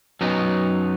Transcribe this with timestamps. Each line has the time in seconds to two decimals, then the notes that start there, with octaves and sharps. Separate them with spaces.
0.21 F#2 F#3 B3 D#4